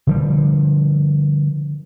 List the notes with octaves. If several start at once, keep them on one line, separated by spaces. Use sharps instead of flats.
D3 F3 G3